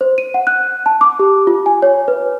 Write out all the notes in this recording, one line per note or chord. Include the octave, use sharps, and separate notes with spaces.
C5
D#7
F#5
F#6
A5
D6
G4
F4
G#5
C#5
B4